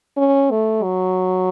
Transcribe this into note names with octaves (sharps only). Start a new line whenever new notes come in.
C#4
A3
F#3